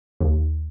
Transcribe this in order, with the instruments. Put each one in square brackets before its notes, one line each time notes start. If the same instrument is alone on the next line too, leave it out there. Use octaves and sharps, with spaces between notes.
[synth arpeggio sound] D#2